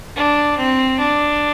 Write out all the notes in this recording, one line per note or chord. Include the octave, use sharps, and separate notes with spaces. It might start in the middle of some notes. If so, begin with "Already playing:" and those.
D4
C4
D4